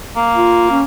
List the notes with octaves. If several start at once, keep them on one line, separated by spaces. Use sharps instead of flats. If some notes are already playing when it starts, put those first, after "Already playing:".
A#3
F4
C#4